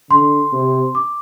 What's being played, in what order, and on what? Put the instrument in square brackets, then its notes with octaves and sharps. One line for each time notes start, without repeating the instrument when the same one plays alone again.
[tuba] D3 [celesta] C6
[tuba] C3
[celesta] D6